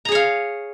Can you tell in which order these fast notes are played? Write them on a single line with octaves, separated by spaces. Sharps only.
A#5 G#4 C#5 F5